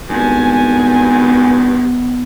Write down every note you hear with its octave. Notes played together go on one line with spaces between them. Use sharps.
G#1 G2 B3 G#5